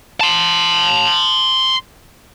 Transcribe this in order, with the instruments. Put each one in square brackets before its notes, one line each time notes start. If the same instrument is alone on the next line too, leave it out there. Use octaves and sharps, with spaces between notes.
[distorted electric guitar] A5 C6